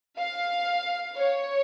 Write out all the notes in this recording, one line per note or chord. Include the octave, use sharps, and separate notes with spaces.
F5
C#5